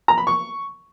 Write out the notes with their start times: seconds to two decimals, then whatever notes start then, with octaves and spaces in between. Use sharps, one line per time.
0.08 A#5
0.18 B5
0.27 C#6